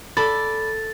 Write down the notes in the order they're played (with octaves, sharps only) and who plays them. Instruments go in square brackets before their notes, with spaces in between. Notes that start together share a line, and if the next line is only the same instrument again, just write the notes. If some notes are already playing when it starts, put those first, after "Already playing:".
[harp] A4 [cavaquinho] D5 B5 [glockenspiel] A6